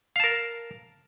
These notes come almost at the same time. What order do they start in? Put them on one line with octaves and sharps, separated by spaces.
F5 A5 A#4